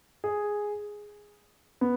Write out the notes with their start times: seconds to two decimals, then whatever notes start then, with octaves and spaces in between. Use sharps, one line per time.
0.24 G#4
1.81 B3